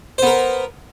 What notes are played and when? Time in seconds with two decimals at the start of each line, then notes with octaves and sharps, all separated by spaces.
0.18 C5
0.23 B3
0.27 A#4